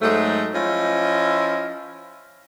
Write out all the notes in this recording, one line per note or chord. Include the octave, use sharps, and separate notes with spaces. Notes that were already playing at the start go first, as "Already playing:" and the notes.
G#2 F#3 G#3 A3
F3 C#4 E4 F4 D#5